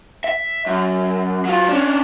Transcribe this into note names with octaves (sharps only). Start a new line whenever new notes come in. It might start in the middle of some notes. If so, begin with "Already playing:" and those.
E5
F#2
F#3 F4
C#4 D4